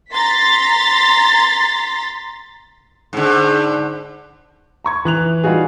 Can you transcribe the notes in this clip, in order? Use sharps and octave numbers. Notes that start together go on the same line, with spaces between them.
A#5 C6 A6 B6
G#2 D3
A#5 C#6 G#6
E3 F#6 F7
G3 D#4 F4 F#4 G#4